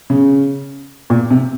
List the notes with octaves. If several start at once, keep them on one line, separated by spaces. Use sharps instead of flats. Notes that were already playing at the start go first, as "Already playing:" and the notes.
C#3
A#2
C3